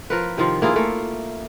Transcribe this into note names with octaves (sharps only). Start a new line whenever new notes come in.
F3 A#4 B4
C3 D#3 F3 F4
A#3 E4 F4 G#4
A3 A#3